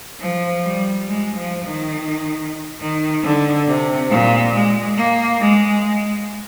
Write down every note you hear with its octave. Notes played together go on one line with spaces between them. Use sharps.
F3
G3
G#3
F3
D#3
D#3
D3
C3
A#2
G#3
A#3
G#3
G#3